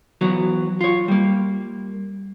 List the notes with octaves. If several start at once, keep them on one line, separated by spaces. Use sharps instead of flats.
E3 F#3 B3
F4 C#5
G3 A#3